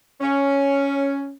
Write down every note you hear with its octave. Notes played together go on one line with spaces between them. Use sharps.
C#4